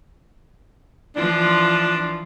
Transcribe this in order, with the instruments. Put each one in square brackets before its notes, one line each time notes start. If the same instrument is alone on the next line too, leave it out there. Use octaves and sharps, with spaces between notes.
[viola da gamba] E3 F3 F4 [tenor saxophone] D4